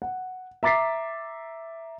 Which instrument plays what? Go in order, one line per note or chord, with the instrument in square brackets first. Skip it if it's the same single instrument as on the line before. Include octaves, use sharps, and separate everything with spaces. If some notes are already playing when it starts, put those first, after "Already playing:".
[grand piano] F#5
E5 A#5 D6 A6 B6 C7